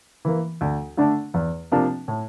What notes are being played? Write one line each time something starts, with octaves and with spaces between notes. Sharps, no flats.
E3 A#3
D2
D3 A3 D4
E2
C3 F3 A#3 D4
A2